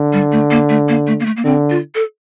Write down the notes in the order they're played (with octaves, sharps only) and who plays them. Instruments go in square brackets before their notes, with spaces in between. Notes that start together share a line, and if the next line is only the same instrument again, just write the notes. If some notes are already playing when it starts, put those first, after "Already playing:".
Already playing: [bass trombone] D3
[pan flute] G3
A3
A#3
A3
A#3
A3
A#3
A3
A#3
[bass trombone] D3 [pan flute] C4
[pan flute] F4
A4